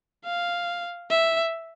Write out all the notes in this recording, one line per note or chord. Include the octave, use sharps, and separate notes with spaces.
F5
E5